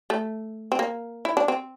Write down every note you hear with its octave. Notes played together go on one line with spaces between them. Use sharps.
A3
C4
A#3
E4
D4
C4